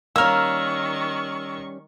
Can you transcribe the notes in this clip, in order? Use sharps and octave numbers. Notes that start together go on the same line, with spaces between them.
D#3 G3 A#3 C#4 A#4 C#6 E6 F6